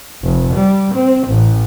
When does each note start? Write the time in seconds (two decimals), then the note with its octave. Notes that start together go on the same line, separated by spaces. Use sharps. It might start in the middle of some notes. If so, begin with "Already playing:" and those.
0.23 F1
0.54 G3
0.95 C4
1.28 A1